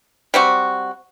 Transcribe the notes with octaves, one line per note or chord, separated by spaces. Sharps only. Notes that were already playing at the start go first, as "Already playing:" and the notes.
G3 C4 F#4